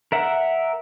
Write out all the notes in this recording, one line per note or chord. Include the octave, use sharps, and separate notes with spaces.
A#4 E5 F#5